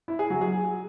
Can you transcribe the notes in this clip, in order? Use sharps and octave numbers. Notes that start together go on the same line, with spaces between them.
E4
G#4
F#3
G#4